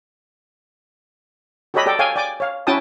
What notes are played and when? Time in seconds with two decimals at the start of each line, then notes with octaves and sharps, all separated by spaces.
1.74 F#4 G4 A4 C#5 D#5 B5
1.86 G4 A4 D5 G5
1.99 A4 C#5 F5 G5 G#5
2.16 D5 G5 G#5 D6
2.40 C#5 F5
2.67 C#4 E4 F#4 G5 A5 D#6